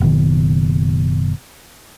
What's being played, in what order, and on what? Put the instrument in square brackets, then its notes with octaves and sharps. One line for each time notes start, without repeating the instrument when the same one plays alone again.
[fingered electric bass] F#1 B2 D#3